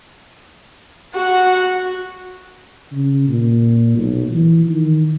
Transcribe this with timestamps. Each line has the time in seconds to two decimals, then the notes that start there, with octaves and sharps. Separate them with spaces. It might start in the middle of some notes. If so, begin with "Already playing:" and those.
1.15 F#4 F#5
2.91 C#3
3.28 A#2
3.97 B1
4.32 E3
4.68 D#3